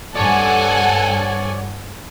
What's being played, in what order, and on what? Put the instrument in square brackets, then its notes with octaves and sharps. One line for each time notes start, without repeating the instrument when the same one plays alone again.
[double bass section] G2 [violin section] A4 F#5 G#5 [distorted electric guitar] C#5 D5